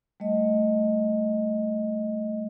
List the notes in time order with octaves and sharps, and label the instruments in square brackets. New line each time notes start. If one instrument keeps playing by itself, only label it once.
[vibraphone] G3 A3 D#5